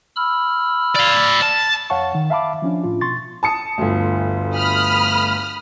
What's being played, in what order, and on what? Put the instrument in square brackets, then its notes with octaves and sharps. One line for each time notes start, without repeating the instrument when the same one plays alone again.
[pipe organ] B5 E6 F6
[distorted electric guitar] D5 F5
A5
[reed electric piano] F2 C#5 F5 F#5 A5 C#6
D#3
E5 F5 A5 B5 D6
F3 C#4 D4
A2 F4
B2 C6 C#6 A6
[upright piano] A5 D#6 C#7
G1 D2
[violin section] B5 D#6 F6